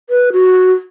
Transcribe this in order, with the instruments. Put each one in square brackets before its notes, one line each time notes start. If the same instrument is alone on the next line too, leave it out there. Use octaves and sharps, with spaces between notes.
[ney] B4
F#4